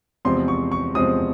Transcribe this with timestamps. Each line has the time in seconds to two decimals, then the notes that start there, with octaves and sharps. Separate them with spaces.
0.25 E2 C3 F3 G#3 C4 C6
0.48 C#6
0.72 C#6
0.95 E2 C3 F3 G#3 C4 D#6